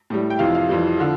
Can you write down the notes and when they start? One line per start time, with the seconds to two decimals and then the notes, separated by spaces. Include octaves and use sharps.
0.10 A2 G3
0.30 G5
0.39 F2 C3 E3 F5
0.55 F5
0.69 F2 E3 G3
0.98 D3 F3